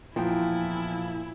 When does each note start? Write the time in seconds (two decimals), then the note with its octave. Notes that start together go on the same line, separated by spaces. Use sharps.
0.16 E2 A#2 F3 E4 G5